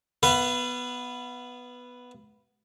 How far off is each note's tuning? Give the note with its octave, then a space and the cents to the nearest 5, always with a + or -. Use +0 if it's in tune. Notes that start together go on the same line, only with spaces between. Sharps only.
B3 +0 B4 +0 F5 -40